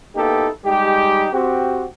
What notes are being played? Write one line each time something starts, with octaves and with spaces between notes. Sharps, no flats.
A#3 B3 D#4 E4 G4 A4
G3 G#3 D#4 G4
C4 F#4 G4